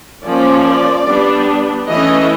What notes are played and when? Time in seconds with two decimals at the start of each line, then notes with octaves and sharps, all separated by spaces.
0.24 F3 A#3 C#4 D5
1.06 G3 B3 D4
1.87 E3 A3 C#4 D#5